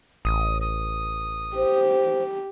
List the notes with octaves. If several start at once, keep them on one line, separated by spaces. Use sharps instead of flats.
A1 D#6
D#6
G4 C5